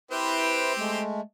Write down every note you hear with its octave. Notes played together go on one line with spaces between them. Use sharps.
C4 E4 G4 B4 C5
G#3 A3